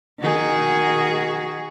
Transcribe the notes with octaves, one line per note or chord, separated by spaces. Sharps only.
D#3 F#4 G#4